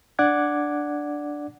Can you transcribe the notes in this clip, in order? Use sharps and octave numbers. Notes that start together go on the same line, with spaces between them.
D4 D5 F#5 D6 F#6 G#6